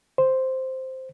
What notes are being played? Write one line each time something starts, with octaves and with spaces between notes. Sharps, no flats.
C5